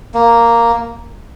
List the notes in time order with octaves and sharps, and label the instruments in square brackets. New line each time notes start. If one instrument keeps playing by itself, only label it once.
[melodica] A#3